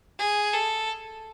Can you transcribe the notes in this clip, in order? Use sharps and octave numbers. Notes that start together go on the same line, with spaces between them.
G#4
A4